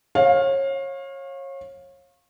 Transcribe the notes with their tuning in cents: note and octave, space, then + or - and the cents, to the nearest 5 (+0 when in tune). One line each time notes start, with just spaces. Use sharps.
C#5 -30 F5 +15